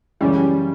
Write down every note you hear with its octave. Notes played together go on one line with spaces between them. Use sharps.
F#2 C#3 E3 G3 G#3 C#4